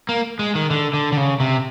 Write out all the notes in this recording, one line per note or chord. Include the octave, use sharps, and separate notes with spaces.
A#3
G#3
D#3
D3
D3
D3
C#3
C3